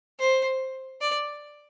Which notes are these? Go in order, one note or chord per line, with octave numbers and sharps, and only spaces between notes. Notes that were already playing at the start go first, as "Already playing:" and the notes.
C5
D5